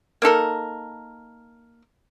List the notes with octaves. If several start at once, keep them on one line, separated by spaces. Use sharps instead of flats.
A#3 D#4 A4 A#4